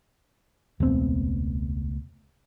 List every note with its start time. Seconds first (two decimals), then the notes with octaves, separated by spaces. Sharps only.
0.80 E1 C#2 A3 B3 C4